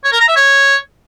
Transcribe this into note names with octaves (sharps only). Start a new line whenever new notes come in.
C#5
A#4
A#5
E5
C#5